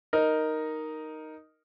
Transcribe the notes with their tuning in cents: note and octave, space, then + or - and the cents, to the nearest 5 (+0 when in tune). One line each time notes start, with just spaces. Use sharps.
D#4 +0 A#4 +0